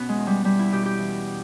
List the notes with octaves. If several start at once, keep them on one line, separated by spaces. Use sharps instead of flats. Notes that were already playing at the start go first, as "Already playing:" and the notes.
Already playing: B2 B3 C#4
G#3
E2
G3
E2 G3
E4
B2 G4
G4
E3